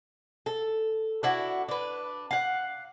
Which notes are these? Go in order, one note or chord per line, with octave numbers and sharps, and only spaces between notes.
A4
D4 E4 F#4
D4 B4
F5 F#5